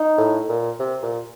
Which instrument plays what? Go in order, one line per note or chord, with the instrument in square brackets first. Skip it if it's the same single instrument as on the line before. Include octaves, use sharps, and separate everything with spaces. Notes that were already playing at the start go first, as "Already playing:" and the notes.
Already playing: [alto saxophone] D#4
[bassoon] A2
A#2
C3
A#2